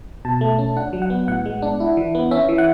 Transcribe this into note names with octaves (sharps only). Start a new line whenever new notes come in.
B2 A5
A3
C#4
D4 F#5
F#3
F#5
B3
A2 F#5
G#3
D4
E4
E3
B3
C#4 E5
E3
F#5